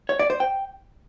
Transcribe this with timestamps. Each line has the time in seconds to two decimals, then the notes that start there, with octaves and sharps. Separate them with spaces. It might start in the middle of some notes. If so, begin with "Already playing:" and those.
0.09 C#5
0.19 D5
0.30 C5
0.40 G5